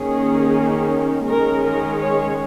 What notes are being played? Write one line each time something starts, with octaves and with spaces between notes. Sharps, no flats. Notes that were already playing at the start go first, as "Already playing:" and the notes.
Already playing: D#3 A#3 C#4 G#4
D#3 G#3 C#4 A#4
A#4
C#5